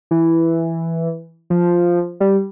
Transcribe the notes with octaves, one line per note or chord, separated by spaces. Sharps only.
E3
F3
G3